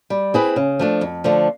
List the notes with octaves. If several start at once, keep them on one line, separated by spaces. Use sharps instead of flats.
G3
C4 E4 G#4 B4
C#3
F3 A3 D4
F2
D3 F3 A3